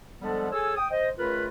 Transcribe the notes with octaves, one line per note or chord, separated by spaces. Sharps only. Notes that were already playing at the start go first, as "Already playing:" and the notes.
D3 F3 G3 G#3 B3 A4
G#4 A4 C#5 G#5 E6
G5 D#6
C5 D#5
C#2 A3 F4 A#4 B4